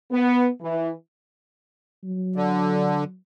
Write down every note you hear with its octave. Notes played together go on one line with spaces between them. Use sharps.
B3
E3
F#3
D3